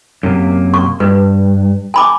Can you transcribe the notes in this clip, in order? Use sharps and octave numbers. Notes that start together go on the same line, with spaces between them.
F#2 C3 A#3
C#6
G2 B4
G#5 B5 D6